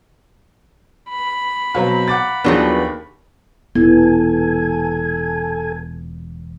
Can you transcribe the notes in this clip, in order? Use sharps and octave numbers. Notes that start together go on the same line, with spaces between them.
B5
B2 F#3 C4 F5 A#5
F#5 D6 A6
D#2 F3 F#3 B3 D4 G#4 B4
E1 A#2 E3 B3 E4 A4 G#5